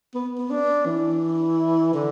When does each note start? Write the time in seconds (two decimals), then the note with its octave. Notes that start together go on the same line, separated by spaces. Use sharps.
0.15 B3
0.38 B3
0.50 D4
0.86 E3
1.94 D3